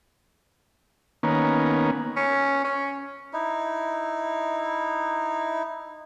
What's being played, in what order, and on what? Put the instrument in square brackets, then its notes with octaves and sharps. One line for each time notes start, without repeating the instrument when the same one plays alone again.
[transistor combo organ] D#3 A#3 B3 C#4
[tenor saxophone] C#4
C#4
[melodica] D#4 E4